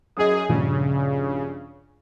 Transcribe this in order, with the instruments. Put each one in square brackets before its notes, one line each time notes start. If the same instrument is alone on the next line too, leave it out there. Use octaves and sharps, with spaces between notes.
[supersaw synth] F#2 G#4 [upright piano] D#5 D#6
[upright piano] A#1 G2 [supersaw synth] C#3